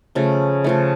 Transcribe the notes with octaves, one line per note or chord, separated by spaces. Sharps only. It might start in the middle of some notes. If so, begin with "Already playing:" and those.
C#3 F3 A3
C#3 F3 A3